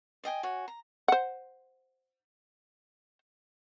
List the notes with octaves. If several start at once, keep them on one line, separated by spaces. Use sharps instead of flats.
D5 D#5 G5 G#5
F#4 C#5 G#5
A#5
C5 F#5